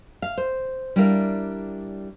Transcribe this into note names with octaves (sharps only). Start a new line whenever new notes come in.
F5
C5
G3 D4 E4 A#4 F5